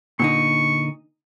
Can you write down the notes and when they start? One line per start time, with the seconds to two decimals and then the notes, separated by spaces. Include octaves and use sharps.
0.20 A#2 D3 D#4 C#6